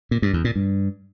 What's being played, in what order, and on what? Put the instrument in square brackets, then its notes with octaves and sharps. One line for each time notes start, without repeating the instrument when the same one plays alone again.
[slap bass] A#2
G2
E2
A#2
G2